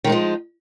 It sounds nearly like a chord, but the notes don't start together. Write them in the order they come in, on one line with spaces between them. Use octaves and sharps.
D#3 G#3 D#4 F3